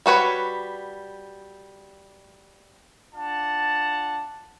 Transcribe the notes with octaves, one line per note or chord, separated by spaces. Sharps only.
G3 F#4 B4 C#5
D4 F4 D5 F#5 A5